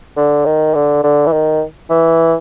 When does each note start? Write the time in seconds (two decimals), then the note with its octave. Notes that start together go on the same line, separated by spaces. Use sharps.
0.17 D3
0.46 D#3
0.75 D3
1.04 D3
1.27 E3
1.32 D#3
1.90 E3